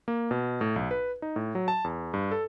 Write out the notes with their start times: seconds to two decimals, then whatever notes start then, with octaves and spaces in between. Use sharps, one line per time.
0.08 A#3
0.31 B2
0.61 A2
0.76 B1
0.91 B4
1.22 D#4
1.36 A2
1.55 F#3
1.68 A5
1.84 E2
2.14 G2
2.31 A4